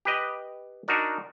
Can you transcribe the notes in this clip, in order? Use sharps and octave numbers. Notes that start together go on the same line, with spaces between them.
G4 B4 D#5
D4 D#4 F#4 A#4 D5